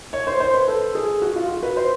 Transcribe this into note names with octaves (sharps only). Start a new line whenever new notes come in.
C#5
C5
C5
B4
A4
G#4
F#4
F4
F#4
B4
C5